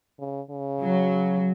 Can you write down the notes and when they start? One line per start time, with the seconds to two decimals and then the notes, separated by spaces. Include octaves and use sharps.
0.20 C#3
0.51 C#3
0.82 F#3